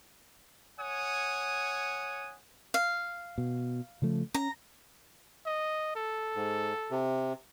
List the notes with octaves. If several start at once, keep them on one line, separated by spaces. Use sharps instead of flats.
C#5 F#5 G#5 D#6
F5
B2
C#3 F3 A3
C#4 A#5
D#5
A4
G#2
C3